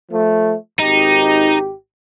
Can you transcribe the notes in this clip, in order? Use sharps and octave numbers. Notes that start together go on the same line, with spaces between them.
F3 A3
G#1 D#4 G4